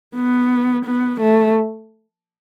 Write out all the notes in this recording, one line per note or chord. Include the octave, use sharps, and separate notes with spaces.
B3
B3
A3